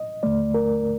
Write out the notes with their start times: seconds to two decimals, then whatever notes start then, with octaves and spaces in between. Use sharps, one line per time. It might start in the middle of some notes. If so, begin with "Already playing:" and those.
Already playing: D#5
0.23 D#2 D3 A3 D5
0.54 A#4